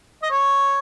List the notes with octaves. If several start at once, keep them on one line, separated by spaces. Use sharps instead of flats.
D#5
C#5